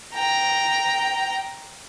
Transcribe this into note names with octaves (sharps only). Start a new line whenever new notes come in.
G5 A#5